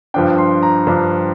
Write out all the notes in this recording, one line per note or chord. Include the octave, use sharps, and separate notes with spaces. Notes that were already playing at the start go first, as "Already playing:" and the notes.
G2 F3 D4 G5
C6
A#5
G2 F3 D4